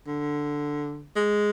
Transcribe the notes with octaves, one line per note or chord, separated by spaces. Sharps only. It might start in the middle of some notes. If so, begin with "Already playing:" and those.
D3
G#3